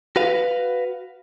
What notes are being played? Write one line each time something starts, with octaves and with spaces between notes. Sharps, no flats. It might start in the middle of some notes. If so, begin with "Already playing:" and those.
F#4 B4 F5